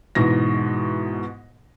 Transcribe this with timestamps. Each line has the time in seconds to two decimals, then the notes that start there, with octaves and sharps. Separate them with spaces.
0.15 G#2 B2 E3 A#6